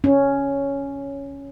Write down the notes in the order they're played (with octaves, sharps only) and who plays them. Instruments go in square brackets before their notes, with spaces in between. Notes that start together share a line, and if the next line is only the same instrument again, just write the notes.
[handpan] C#4